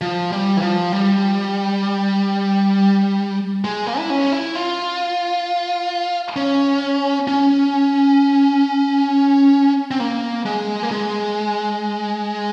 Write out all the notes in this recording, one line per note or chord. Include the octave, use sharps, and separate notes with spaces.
F3
G3
E3
F3
G3
G#3
A#3
E4
C#4
E4
F4
C#4
C#4
C4
A#3
G#3
A#3
G#3